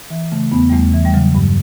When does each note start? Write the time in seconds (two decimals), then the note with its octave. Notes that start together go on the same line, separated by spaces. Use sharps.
0.10 E3
0.32 C#3 A3
0.52 E2 B3
0.69 G3
0.73 E2 A3
0.93 E3
1.05 G3
1.14 C#3 F#3
1.35 G2